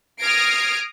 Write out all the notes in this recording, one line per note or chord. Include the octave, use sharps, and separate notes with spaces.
D#6 F6 G#6 A#6 C7 D7